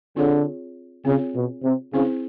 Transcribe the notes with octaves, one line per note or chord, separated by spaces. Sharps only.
D3 C4 F4 G#4 C#5
C#3 C4 F4 G#4 C#5
B2
C3
C#3 C4 E4 G#4 C5